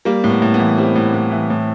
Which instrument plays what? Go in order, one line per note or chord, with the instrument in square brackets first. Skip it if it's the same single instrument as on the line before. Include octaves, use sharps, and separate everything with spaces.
[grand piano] G3 A#3
A2
B3
A2
B3
E3
G3 C4
A2
A2
E3
A2